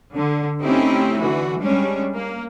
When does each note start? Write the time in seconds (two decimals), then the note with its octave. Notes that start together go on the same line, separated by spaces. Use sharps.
0.15 D3
0.63 A3 C4 C#4 D#4 E4 G4
1.20 D3 E3 F#4
1.62 G3 G#3 C#4 D4
2.14 A#3